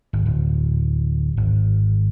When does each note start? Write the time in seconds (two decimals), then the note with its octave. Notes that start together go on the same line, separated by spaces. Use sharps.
0.13 G#1
0.26 D1
1.37 G#1